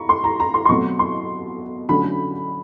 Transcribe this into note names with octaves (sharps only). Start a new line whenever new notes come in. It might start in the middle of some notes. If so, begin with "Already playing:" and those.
Already playing: A#5 B5 C#6
C6
A#5
A#5
C6
C6
B2 F#3 A3 C4 C#6
C6
D3 F#3 A3 C#4 B5